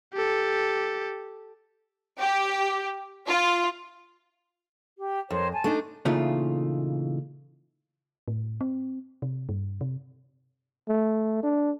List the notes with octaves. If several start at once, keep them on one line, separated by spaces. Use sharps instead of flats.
G4 A4
G4
F4
G4
F2 A#4 C5 C#5
G#5 A5
A3 D4 D#4
A#2 C#3 E3 A3 D#4 F4
A2
C4
C3
G2
C3
A3
D4